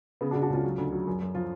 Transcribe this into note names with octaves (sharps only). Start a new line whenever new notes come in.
C#3 B3
D4 F#4
C#3
D4 F#4
C#2 C#4 F4
F#3
D2
F#3
F#2
F#2
F3 F4